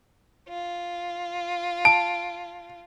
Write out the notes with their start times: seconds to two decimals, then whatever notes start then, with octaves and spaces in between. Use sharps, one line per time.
0.49 F4
1.85 A5 D7